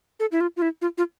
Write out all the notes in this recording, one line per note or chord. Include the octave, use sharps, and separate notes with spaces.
A4
E4
F4
F4
E4
F4
F4